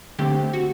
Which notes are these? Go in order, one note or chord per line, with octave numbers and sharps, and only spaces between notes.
D3 A3 C4 G4
F#4